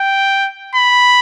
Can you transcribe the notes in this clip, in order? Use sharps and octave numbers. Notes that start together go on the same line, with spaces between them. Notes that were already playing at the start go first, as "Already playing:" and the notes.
Already playing: G5
B5